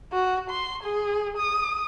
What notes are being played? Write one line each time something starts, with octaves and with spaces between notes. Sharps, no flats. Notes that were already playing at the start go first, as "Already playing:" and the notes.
F#4
C6
G#4
D#6